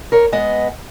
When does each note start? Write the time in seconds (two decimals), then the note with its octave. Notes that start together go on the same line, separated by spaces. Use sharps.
0.12 A#4 C#5
0.32 G#3 B3 D#5